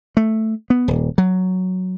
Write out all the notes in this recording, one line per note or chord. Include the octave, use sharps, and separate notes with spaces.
A3
B3
D#1
F#3